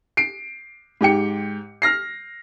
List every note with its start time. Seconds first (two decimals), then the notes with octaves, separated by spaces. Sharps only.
0.17 C7 D7
1.01 G#2 G4 G5 C#7
1.82 F6 A#6 C7